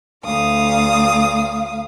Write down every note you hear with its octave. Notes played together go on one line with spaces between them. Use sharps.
D2 F5 D#6